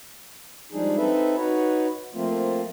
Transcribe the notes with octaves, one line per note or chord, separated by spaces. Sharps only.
F3 G3 G#3 D4 D#4 G#4
C4 D#4 A4 B4 E5
D#4 F#4 B4 C#5
F3 A3 A#3 C4 F4